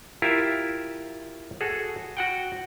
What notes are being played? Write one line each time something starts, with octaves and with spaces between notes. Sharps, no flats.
E4 F4 G4 A#4 E5
F#4 G#4 A4
F#4 F#5 G5